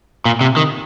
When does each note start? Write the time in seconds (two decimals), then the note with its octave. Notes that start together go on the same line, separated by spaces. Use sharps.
0.25 A#2
0.41 C3
0.57 D#3